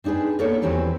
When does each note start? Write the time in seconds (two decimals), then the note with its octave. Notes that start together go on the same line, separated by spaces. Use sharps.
0.04 C4 D4 D#4 G#4 B4
0.39 A#3 B3 D4 D#4 A4 C#5
0.62 E2 E3 F#3 C4 G4 B4